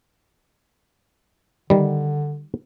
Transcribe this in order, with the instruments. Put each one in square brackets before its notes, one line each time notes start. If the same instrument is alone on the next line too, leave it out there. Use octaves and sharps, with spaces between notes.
[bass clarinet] D3 [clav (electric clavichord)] D#3 G3